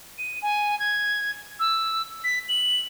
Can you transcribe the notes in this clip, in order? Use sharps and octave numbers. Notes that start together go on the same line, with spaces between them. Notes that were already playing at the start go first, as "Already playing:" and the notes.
D#7
G#5
G#6
E6
B6
F#7